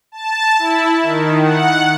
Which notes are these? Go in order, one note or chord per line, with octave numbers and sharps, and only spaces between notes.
A5
E4
D#3
F#5